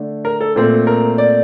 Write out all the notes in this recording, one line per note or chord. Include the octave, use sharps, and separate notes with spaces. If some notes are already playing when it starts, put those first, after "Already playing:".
Already playing: D3 A3 D4
A#4
A4
A#2 A3 C4 A4
A#4
D5